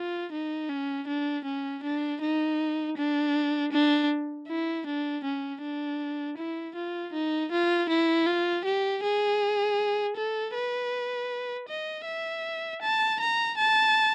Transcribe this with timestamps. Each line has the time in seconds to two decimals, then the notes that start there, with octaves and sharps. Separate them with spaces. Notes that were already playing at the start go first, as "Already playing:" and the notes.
Already playing: F4
0.32 D#4
0.69 C#4
1.07 D4
1.45 C#4
1.83 D4
2.21 D#4
2.97 D4
3.72 D4
4.48 E4
4.86 D4
5.24 C#4
5.62 D4
6.37 E4
6.75 F4
7.13 D#4
7.51 F4
7.89 E4
8.26 F4
8.65 G4
9.03 G#4
10.16 A4
10.54 B4
11.68 D#5
12.06 E5
12.82 A5
13.20 A#5
13.58 A5